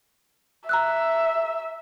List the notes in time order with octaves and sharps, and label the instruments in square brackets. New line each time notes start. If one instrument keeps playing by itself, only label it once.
[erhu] E5 [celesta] A#5 E6 F#6